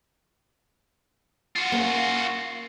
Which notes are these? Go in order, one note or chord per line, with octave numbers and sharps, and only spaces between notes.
F4 F#4
A#3 C#4